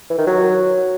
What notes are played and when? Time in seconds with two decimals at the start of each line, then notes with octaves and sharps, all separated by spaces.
0.10 E3
0.18 D#3
0.27 F#3